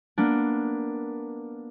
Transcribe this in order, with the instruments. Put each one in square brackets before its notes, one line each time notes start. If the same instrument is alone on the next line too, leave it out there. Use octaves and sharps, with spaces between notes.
[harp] A#3 B3 D4